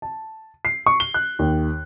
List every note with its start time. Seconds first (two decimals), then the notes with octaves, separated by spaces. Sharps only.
0.02 A5
0.65 C7
0.86 C#6
1.00 G7
1.14 F#6
1.39 D#2